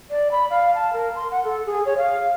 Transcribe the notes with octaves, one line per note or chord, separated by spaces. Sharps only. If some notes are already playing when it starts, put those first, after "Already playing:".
D5
B5
F5
A5
A#4
C6
F#5
A4
G#4
C#5
F5